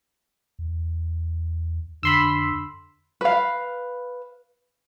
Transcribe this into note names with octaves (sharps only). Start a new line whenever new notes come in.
E2
F2 D3 B5 C6 E6
B4 F5